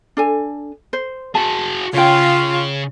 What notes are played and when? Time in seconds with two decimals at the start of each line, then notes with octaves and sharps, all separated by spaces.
0.17 D4 A4 G#5
0.93 C5
1.35 F#4 G#4 A5
1.93 C#3 F4 C#5 G5